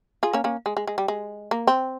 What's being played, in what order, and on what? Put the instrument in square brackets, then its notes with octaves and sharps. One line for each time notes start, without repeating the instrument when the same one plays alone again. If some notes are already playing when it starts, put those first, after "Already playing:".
[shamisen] F4 G#4
A#3 C#4
A#3 C#4
G#3
G#3
G#3
G3
G#3
A#3
C4